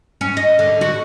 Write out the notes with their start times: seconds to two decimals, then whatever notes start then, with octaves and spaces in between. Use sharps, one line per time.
0.21 C#4
0.37 D#5
0.59 D3
0.81 F#4